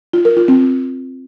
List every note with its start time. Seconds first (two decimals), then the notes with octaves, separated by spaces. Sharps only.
0.13 F4
0.25 A#4
0.37 F4
0.48 C4